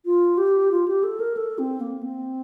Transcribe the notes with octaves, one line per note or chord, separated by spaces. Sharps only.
F4
G4
F4
G4
A4
A#4
A4
C4
A#3
C4